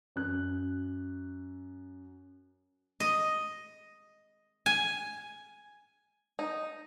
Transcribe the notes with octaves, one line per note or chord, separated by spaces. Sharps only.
F#2 F#6
D#5
G#5
D#4